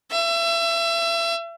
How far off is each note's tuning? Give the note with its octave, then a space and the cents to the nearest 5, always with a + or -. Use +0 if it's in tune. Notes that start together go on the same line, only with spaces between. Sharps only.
E5 +30